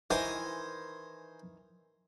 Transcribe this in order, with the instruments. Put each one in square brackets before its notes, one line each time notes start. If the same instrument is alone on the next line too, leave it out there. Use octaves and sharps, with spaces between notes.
[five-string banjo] D#3 E3 [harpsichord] C5 G#5 A#5